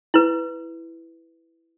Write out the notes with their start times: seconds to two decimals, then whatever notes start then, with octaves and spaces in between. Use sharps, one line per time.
0.14 E4 B4